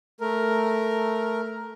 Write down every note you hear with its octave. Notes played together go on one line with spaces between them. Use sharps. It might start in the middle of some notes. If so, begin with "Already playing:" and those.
A3 A#4